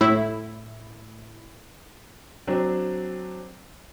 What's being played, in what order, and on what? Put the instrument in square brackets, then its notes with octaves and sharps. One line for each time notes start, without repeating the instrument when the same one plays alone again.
[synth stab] A2 E4
[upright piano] F#3 C4 D4